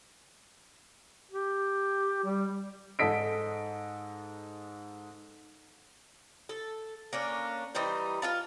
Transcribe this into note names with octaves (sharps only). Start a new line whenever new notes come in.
G4
G3
G#2 A4 D#5 B6 D7
A4
A#3 C#4 D4
E3 G3 D#4 C5
F4 F5 A5